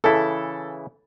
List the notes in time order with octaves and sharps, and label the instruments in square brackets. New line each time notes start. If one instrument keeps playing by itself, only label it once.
[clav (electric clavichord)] C#3 E3 E4 [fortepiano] A4